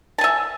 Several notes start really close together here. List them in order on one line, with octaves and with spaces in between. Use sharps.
A5 G#5 E5